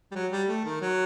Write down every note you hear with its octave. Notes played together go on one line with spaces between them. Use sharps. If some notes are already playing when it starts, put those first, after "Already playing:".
G3
F#3
G3
A3
D#3
F#3